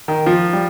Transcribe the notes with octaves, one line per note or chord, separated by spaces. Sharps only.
D#3
F3
G3